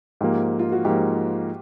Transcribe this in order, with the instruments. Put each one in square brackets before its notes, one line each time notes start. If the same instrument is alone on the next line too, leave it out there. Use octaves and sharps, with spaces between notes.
[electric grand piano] G#2 F3 A#3 [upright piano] G4
[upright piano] F4
F#4
[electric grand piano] G#2 F3 A#3 [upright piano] G4